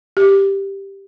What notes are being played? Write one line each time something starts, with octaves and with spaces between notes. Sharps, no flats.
G4